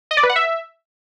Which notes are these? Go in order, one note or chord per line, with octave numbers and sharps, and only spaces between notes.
D#5
D5
B4
F#5
E5